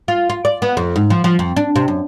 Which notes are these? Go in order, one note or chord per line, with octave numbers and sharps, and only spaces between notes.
F4
F4
D5
B3
F2
G#2
F3
F3
F2
D4
C3
F#2